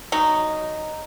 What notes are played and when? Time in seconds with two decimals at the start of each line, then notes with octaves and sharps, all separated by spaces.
0.12 F#3 D#4